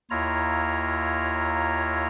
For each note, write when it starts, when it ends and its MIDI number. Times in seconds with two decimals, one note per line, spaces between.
0.11 2.08 39
0.11 2.08 64
0.11 2.08 65
0.11 2.08 73
0.11 2.08 82